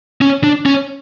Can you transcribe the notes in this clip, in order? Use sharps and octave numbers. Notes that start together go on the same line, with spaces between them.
C#4
D4
C#4